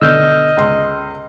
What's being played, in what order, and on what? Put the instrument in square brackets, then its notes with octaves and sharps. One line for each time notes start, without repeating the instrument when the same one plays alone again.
[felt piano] B2 D3 [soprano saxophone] D#5 [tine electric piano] E6 F6 G6
[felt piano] C#2 C6